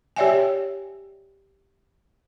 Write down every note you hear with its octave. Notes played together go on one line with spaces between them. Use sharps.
G4 C#5 D5 E5 G5 G#5